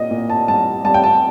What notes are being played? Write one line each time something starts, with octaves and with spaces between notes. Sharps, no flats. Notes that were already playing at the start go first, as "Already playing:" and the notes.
Already playing: A#2 D#5
A#2
A5
G3 A5
G3 A5
G5
A5